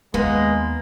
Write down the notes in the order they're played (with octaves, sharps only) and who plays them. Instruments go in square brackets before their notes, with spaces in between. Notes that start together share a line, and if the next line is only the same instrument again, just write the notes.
[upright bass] D#2 [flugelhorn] G#3 [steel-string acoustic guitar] A#3 [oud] B3